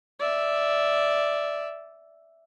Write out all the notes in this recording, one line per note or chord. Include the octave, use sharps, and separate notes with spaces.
D5 E5